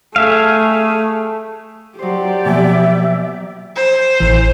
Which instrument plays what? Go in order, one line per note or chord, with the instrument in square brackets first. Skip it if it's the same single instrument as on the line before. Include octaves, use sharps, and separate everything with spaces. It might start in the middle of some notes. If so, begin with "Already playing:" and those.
[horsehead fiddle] A3 [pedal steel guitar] G#4 E5 F5
[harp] F#3 C5 [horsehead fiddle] G4 D5
[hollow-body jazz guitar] B2 F3 G#5 [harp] A#3 [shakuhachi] E5
[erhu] C5
[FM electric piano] A1 E3